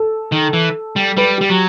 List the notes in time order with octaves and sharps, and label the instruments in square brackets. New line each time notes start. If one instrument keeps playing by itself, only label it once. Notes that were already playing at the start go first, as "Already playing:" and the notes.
Already playing: [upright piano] A4
[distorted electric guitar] D#3
E3
G3
[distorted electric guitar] G3 [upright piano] B4
[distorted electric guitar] G3 [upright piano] G4
[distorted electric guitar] F#3